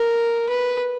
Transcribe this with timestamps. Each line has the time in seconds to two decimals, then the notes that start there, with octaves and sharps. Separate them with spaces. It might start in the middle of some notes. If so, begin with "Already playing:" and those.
Already playing: A#4
0.49 B4